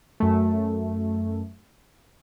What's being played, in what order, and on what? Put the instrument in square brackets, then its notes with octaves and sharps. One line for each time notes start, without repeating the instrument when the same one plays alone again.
[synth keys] F#2 A3